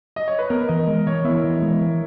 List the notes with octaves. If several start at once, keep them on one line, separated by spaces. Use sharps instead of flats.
D#5
C#5
B4
B3 A#4
E3 D#5
G#3
E3 C#5
B3 E4
E3
G#3
E3